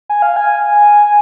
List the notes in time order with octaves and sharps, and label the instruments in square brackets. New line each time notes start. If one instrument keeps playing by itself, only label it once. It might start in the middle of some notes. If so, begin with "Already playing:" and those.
[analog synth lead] G#5
F5
G#5